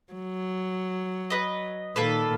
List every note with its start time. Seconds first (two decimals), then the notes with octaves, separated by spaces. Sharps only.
0.13 F#3
1.30 B4 D#5
1.96 A#2 D#3 A#3 A4 B4